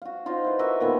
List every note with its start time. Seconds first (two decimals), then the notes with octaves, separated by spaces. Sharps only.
0.02 F#4 F5
0.26 D#4 F4 C5 D#5
0.44 E4 B4
0.59 F#4 A#4 D#5 E5
0.80 A#2 D#3 B3 F4